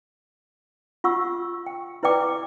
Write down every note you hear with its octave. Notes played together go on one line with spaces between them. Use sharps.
F4 F#5 C#6 E6
G5
E4 B4 D5 G5 D6